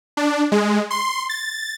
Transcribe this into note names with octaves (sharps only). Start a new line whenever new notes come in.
D4
G#3
C6
A6